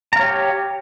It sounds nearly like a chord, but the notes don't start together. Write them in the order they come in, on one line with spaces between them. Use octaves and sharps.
A#5 F5 C#5 G4